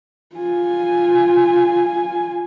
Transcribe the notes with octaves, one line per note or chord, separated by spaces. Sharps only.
F4 G#5